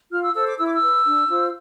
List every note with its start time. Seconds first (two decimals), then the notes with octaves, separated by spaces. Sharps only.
0.11 F4 F6
0.22 E6
0.34 A4 C5 E6
0.46 D6
0.58 E4 E6
0.66 D6
0.73 E6
0.82 B4
1.05 D4
1.29 F4 C5